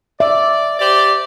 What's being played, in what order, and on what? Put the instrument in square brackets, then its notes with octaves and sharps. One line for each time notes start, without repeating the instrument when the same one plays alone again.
[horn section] D5 [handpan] E5
[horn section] G4 C5 D5